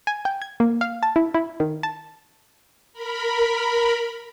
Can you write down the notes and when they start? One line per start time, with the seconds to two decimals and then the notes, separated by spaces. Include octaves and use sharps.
0.07 G#5
0.25 G5
0.42 G#6
0.60 A#3
0.81 F5
1.03 A5
1.16 E4
1.34 E4
1.60 D#3
1.83 A5
2.93 A#4 B5